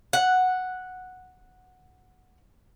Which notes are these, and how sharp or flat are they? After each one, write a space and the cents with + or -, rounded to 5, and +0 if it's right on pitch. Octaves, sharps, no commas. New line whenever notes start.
F#5 -5